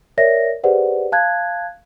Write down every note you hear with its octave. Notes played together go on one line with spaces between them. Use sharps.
A#4 C#5 D5 E5 A#6
G4 G#4 B4 C5 D5 F#5
F5 A5 F#6 G#6